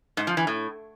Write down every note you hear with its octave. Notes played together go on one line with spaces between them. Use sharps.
G#2
F3
E3
A2